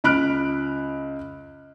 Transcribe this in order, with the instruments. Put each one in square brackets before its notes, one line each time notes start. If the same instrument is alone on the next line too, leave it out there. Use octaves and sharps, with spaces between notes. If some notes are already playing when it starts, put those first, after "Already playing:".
[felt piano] C#2 B5 F6 F#6 D7